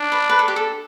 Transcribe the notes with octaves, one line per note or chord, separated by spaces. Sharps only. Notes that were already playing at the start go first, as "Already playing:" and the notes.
Already playing: D4
B4
B4
A4
G4
A4